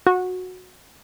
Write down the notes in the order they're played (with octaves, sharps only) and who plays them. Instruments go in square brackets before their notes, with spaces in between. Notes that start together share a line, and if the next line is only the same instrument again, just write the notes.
[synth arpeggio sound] F#4